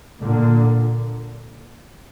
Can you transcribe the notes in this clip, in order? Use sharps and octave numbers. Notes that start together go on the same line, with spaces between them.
A#2 D3